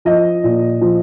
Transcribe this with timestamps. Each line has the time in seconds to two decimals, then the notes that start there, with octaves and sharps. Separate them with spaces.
0.05 F3 D#5
0.44 A#2
0.81 F3